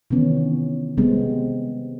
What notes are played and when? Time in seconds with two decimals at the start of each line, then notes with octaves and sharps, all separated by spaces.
0.11 C3 D#3 E3 B3 C#4
0.97 C3 G3 G#3 B3 C4